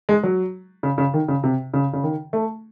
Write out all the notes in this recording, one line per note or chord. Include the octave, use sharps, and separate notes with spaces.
G#3
F#3
C#3
C#3
D#3
C#3
C3
C#3
C#3
D#3
A3